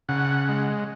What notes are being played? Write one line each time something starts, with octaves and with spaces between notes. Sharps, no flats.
C#3 F#5
G#3